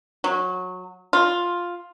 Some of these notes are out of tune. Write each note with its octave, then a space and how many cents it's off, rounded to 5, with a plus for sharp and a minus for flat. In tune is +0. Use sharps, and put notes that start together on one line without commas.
F#3 -20
F4 +5